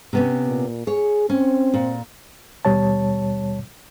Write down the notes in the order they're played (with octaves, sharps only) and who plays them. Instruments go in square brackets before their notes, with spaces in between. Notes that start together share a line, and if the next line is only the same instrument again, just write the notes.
[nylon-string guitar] C3 B3 C#4
[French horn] A#2
[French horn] G#4 [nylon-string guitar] C#5
[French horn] C4 [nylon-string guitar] C#4
[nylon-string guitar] A#2
[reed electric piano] D#2 B2 G3 C#5 A5